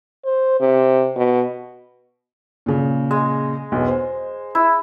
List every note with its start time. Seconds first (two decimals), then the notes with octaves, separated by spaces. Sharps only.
0.24 C5
0.60 C3
1.16 B2
2.66 A#2 C#3
3.11 G#3
3.72 B1 E2
3.88 C5
4.55 E4